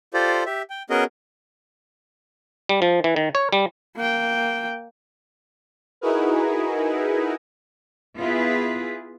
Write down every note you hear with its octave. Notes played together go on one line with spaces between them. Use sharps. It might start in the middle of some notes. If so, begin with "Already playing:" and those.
F4 G4 A4 C5 D5
G4 E5
G5
B3 C#4 F#4 G#4 A#4 D#5
G3
F3
E3
D#3
C#5
G3
A#3 G5
D#4 E4 F#4 G#4 A#4 B4
B3 E4 F4 G#4 B4